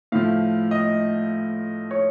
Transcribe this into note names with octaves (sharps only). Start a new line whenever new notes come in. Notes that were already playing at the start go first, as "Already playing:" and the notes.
A2 F3 F5
D#5
C#5